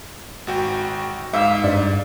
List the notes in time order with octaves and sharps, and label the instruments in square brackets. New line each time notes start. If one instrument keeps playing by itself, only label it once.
[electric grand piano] G#1 F#4 G5
[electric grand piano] G#2 [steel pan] E5 F5
[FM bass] G2 [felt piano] D5